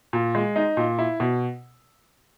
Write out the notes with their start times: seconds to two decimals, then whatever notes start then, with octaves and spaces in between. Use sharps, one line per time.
0.13 A#2
0.35 G#3
0.56 D#4
0.77 A#2
0.99 E4
1.20 B2